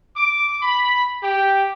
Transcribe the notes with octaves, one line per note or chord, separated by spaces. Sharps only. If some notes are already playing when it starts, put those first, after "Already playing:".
D6
B5
G4